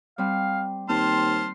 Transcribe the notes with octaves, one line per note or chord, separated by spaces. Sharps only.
G3 C4 F5
D#2 C4 C5 A5 C6 F6